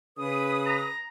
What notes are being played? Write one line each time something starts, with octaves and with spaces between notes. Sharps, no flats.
C#3 B4 D#6
A#5